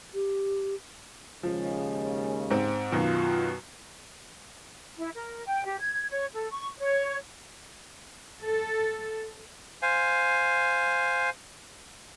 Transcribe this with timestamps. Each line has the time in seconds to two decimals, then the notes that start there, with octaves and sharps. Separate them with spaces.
0.14 G4
1.43 D#2 C#3 F3 G#3
2.50 G#2 C4
2.92 F#2 B2 D#3 F4
4.97 E4
5.15 A#4
5.46 G5
5.65 G4
5.80 G#6
6.10 C#5
6.34 A4
6.51 C#6
6.79 C#5
8.42 A4
9.82 C5 F5 G#5